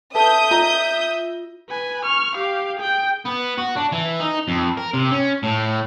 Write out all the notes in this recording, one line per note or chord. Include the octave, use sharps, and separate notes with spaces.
A4 B4 E5 A5 D#6 G6
F4 A#5
B4 G#5
C#6 F6
G4 F5
G#4 G5
B3
F#4
D4
E3
D#4
F2
A#4
C3
C#4
A2